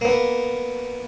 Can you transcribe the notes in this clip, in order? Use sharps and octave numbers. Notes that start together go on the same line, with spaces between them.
A#3 B3